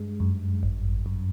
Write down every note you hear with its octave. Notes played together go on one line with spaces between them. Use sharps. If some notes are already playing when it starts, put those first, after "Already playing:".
Already playing: G2 G#3
F#2
G#1
F#2